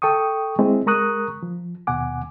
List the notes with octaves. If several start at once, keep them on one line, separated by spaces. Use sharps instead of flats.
A4 G5 C#6 D#6
G#3 C4 E4
G#3 A#4 A#5 C#6 D#6 F#6
F3
D#2 B2 F#5 G#5 D6